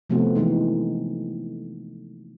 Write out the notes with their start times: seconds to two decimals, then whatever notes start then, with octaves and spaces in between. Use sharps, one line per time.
0.10 C3 F3 A3 B3 C4 F#4
0.35 E3 F3 G#3 D#4